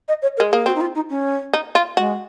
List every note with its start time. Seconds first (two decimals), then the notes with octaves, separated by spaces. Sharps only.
0.08 D#5
0.22 C#5
0.37 A#4
0.40 G#3
0.51 A#3 G#4
0.66 C4 F#4
0.75 D#4
0.81 F4
0.95 D#4
1.10 C#4
1.53 D#4
1.75 F4
1.97 G#3 F#4